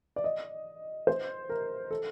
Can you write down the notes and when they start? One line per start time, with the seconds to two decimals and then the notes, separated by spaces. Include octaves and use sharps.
0.16 D5
0.24 D#5
1.07 C5
1.49 A#4
1.91 A4